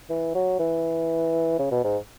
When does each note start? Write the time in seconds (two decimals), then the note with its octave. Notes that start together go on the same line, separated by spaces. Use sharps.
0.10 E3
0.35 F#3
0.59 E3
1.59 C#3
1.71 B2
1.84 G#2